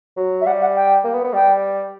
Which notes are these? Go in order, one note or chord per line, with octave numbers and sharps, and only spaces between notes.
F#3
E5
G3 F#5
F#5
G5
A#3
B3
B3
G3 G5